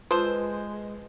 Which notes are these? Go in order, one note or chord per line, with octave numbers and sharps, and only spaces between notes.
G#3 F4 A4 B4 C5